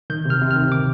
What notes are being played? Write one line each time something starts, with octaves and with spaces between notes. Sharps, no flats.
D#3 G6
C3 F6
C3
F6
D#3
D6